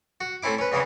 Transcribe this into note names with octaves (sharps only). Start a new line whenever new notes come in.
F#4
A3 C4 C#4 E4 D6
C#4 B4
E2 C#3 E3 C4 C#4